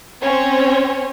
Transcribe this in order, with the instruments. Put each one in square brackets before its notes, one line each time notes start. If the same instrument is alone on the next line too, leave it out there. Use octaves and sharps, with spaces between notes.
[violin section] C4 C#4 C#5